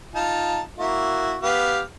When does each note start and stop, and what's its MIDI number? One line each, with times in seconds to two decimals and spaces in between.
0.15 0.60 63
0.15 0.60 65
0.15 0.60 81
0.79 1.37 58
0.79 1.37 64
0.79 1.37 66
1.42 1.80 59
1.42 1.80 67
1.42 1.80 77